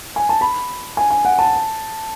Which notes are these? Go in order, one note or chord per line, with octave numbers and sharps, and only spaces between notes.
G#5
A5
B5
G#5
G#5
F#5
A5